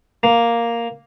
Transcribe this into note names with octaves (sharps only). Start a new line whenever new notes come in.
A#3